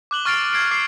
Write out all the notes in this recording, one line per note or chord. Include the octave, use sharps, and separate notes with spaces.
D6 F#6 F#7 G7
C#6 F6 A6 C7 D7 F7
G#6 A6 C7 D7
D6 F#6 C7